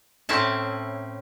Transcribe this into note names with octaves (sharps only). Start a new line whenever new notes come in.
A2 C4 C#4 E4 A5